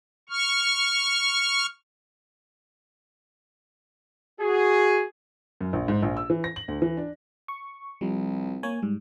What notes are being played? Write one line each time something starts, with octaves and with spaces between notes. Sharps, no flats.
C#6 F6
F#4 G#4
F#2
A#1
G#2
A#1
E6
E3
A#6
F#7
D2
E3
D4
C#6
C2 F3 G3
A#3 C#5 G#5
G#2 G3